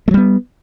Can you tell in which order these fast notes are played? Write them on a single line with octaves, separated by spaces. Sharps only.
A3 F#3 G3 B3